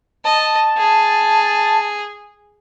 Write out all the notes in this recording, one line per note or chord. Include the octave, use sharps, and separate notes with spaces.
D#5 A5
G#4